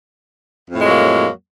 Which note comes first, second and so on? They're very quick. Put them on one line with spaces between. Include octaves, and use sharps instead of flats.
F2 A2 G#3 F#3 A#3